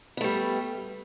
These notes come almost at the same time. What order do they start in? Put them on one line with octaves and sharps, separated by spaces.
B3 A3 G3